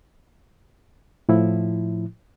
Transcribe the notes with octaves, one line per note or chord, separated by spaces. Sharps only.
A2 F3 E4